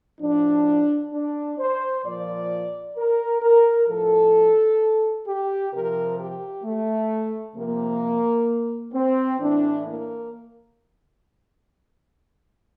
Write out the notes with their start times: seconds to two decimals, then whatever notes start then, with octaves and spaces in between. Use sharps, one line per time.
0.21 A2 F3 D4
1.13 D4
1.59 C5
2.04 A#2 F3 D5
2.97 A#4
3.42 A#4
3.89 A2 F3 A4
5.27 G4
5.73 C3 F3 A#4
6.19 G4
6.64 A3
7.56 C3 F3 A#3
8.94 C4
9.40 A2 E3 D4
9.86 A#3